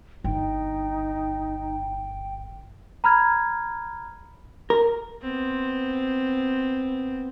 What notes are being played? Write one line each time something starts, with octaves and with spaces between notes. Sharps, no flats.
G1 D#4 G5
A#5 B5 F6 G#6
A#4
B3 C4